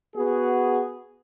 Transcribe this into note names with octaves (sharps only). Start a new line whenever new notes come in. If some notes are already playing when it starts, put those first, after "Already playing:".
B3 F#4 G#4